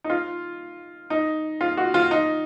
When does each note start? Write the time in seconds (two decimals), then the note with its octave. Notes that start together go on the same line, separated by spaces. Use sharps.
0.04 D#4
0.10 F4
1.10 D#4
1.61 F4
1.77 F#4
1.94 F4
2.11 D#4